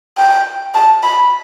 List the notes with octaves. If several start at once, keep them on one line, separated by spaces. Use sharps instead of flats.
G5
A5
B5